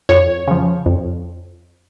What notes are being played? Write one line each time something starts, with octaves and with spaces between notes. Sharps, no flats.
F2 C#5
C#3 F3
F2